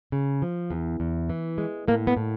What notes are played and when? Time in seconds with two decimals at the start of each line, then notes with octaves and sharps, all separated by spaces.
0.12 C#3
0.42 F3
0.71 E2
1.00 E2
1.29 E3
1.58 G#3
1.88 A2 A#3
2.07 B3
2.17 A2